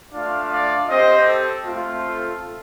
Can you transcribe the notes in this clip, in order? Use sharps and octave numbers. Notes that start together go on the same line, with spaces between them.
A3 D4 F4 D5 F5
D5 F5
C4 G4 C5 D#5
A4
A3 C4 F4
A4